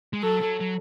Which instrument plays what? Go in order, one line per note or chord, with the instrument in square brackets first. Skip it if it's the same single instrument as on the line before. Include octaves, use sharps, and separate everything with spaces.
[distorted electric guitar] G#3
[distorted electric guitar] F#3 [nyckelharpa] A4
[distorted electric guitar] F#3
F#3